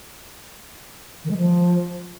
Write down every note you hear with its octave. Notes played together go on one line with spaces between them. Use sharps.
D#3
G#3
F3